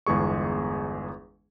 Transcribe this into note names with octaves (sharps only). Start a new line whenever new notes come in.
G1 E2 G#3 G#4 C#6